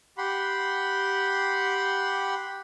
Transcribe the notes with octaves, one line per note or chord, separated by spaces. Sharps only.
G4 F#5 B5 C6